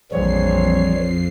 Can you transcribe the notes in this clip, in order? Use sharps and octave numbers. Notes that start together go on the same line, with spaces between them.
A#1 F2 E3 F3 G3 C#5 C7